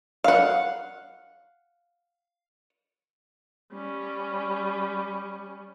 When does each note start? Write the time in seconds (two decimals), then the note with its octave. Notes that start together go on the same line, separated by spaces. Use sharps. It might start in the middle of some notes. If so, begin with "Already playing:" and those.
0.24 F5 F#5
3.72 G3 C#4